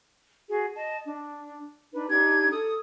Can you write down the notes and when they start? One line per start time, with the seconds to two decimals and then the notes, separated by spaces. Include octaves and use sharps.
0.50 F#4 G#4
0.75 D#5 A5
1.06 D4
1.93 D4 D#4 B4
2.10 D4 D#4 G4 G#6
2.51 A4 D#6